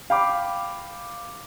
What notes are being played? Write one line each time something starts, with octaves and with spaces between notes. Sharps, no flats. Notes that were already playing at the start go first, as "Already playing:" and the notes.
F5 G5 B5 D6